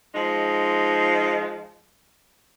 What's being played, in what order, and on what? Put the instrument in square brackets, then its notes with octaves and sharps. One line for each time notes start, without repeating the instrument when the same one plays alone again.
[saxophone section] F3 G#3 D#4